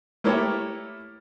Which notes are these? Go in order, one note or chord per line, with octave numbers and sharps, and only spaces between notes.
A3 A#3 E4 G4 C#5